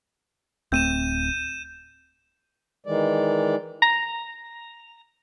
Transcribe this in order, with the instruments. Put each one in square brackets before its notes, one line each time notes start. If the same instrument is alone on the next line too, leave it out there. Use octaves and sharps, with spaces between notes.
[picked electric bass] D1 A3 C4 [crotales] G6 D#7 E7
[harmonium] D#3 E3 G#3 D5
[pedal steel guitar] A#5